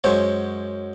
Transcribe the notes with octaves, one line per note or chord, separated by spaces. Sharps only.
F#2 G#3 C5 C#5